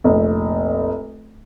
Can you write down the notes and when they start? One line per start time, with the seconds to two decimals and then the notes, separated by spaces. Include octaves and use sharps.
0.04 F1 A#1